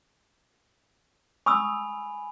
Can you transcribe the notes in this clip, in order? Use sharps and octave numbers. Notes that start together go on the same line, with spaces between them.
G#5 B5 C#6 D#6 E6